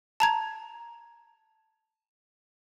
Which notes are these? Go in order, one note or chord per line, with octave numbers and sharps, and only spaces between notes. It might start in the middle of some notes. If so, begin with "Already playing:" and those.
A5 A#5 G#6